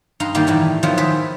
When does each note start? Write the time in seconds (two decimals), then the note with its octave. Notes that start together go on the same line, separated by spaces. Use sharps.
0.20 G2 D#4 F5 A#5 C6
0.35 D#3 G3 A#3 D#4 E4 G4
0.47 A2 E3 G3
0.83 D#3 F3 F#3 B3 E4 F4
0.97 B4 C5 D#5 E5 G5 G#5